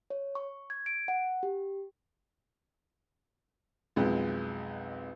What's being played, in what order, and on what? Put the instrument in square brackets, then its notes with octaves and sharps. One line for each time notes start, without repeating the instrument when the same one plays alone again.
[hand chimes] C#5
C#6
G#6
D7
F#5
G4
[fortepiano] B1 F2 G#3